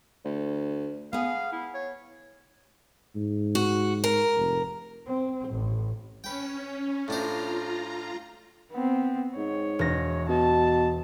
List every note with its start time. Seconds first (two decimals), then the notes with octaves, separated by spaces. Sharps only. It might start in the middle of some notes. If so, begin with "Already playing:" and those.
0.25 D2
1.13 B3 G#4 F5
1.52 E4
1.74 C#5
3.15 G#2
3.55 F#4
4.04 A#4
4.36 F1
5.07 C4
5.50 A1
6.24 C#4 B4 G5
7.08 A2 D4 F4 C5 A#5
8.72 B3 C4
9.36 G#2 C#5
9.79 E1 A#6
10.29 B2 A5